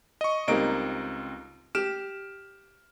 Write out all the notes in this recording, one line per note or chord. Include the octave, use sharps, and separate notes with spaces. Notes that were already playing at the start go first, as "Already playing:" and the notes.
D#5 C#6
C#2 G3 A#3 C4 D#4 D7
G4 F6 D7 E7